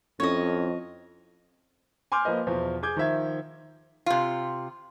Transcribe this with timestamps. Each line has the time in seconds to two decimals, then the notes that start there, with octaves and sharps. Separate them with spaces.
0.20 F2 C#4 E4 A4 C#5 D#5
2.12 G#5 C6 D6 F6 G6
2.25 F3 A#3 B4 D#5
2.47 E2 B2 F3
2.83 G#4 D6 G6 G#6
2.96 D#3 F3 E5 G#6
4.06 C3 F4